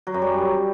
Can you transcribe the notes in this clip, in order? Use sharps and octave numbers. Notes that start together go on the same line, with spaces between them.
F#3
F#2
G3